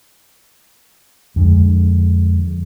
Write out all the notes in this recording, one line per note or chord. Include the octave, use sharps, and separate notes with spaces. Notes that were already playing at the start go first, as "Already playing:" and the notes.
F2 D3 G#3